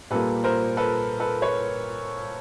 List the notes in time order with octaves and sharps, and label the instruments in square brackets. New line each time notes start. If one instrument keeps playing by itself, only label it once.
[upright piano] A#2 G3 A#3 A4 B4
A#4 C5
A4 B4
A4 B4
B4 C#5